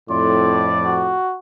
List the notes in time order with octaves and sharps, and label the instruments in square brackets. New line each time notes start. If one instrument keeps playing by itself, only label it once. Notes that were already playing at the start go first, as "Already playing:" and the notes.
[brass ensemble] F2 A2 [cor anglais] D5 [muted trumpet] C6
[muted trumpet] F#4